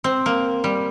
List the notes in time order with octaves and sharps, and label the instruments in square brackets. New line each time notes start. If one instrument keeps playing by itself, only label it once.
[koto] C4
A#3
G3